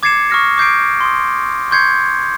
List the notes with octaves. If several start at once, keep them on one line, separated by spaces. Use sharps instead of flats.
D6 G#6 A6 C7 C#7 E7
C#6 D#6 F6 A#6 C#7
D6 G6 C7 D7
C6 D#6
C6 C#6 G6 G#6 C7 C#7